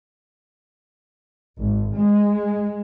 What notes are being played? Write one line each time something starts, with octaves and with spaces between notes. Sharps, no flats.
G#1
G#3